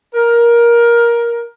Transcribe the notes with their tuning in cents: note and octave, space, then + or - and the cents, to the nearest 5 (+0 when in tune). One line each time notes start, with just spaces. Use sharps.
A#4 +15